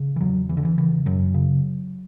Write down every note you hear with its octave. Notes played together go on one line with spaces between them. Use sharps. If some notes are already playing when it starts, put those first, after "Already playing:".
Already playing: C#3
E3
E2 F#3
E2 E3
D3
E3
C#3 E3
F#2 F#3
C#3